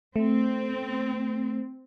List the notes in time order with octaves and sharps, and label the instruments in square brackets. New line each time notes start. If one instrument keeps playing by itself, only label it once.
[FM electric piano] A3 [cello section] C4